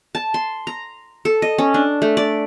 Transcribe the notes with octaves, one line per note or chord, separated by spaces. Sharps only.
A5
C6
A#5
A4
D#5
C#4
D4
A3
D5